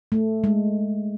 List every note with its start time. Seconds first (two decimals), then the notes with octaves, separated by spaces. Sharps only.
0.12 A3
0.44 G#3